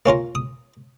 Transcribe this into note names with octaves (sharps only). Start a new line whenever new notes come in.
A#3 C#4 F4 A#4
D#6